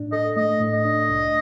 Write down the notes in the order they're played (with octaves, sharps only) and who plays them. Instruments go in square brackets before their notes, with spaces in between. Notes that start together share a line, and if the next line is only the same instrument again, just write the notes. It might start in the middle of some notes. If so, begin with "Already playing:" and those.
Already playing: [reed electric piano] A2 D4
[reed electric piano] A4 [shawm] D#5
[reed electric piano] A3 [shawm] D#5
[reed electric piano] A2
[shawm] D#5
[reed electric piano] D4
C2